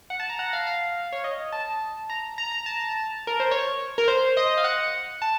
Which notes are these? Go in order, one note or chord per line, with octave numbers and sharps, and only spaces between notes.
F#5
A5
A#5
F#5
F5
F5
C#5
D#5
A5
A#5
A#5
A#5
A5
A5
A#4
C5
C#5
A#4
C5
D#5
F5
F#5
A5